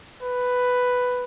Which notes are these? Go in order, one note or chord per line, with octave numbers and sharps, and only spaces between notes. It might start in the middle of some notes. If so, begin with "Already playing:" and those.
B4